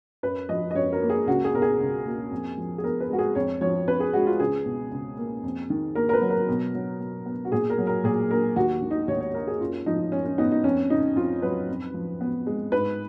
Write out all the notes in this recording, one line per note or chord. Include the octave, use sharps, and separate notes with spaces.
F#2 B4
F3 D#5
D#5
F#2 C#5
A#4
A#3
G#4
C#2 F#4
G#4
B2 A#4
G#4
C#2
A#3
F2
F3
G#4
B3 A#4
B4
G#3 F#4
G#4
F2 C#5
F3 C#5
F2 B4
G#4
G#3 F#4
F4
C#2 G#4
B2
C#2
A#3
F2
D#3
A#3 A#4
A#4
B4
F#3
A#4
B2
F#3
B2
B3
F#4
A#2 G#4
A#4
F#3
A#4
A#2 G#4
A#3 A#4
D#2 F#4
D#3
D#4
D#2 C#5
C#5
A#3 A#4
G#4
F#2 F4
F3 D#4
F#2 C#4
C#4
B3 D#4
D#4
F2 C#4
C#3 D#4
F2 F4
F#3 B4
F2
F3
B3
G#3
G#2 B4